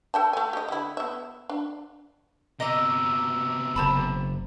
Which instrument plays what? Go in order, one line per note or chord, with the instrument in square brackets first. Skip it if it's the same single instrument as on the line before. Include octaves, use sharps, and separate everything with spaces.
[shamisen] A4 G5 A5
A3 G#5
G4 D#5
D3 E4
B3 E5
D4
[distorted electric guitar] C3 B3 [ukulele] D#5 [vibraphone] A#5 D6 E6
[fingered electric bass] F#1 [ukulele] C5 A5 B5